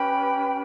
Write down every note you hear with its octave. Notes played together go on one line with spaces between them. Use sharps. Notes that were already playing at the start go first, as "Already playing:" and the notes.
Already playing: C#4 G4 B4 G5 B5
G5